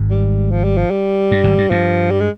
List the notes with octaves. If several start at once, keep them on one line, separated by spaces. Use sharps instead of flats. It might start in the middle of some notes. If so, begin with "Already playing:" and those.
Already playing: G#1 G#2
G3
F3
G3
F3
G3
G2
G#1 G#2
G2
G2 F3
G3
G#3